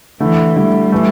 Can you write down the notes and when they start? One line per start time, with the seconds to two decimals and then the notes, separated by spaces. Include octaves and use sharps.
0.20 D3 E3 A3 E4
0.56 D3 G3 A3 E4
0.92 E3 A3